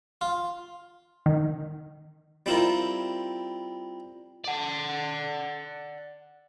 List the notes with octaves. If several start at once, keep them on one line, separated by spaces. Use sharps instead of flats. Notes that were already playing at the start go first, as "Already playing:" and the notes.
F4
D#3
G3 C4 E4 F4 A#4
D5 F#5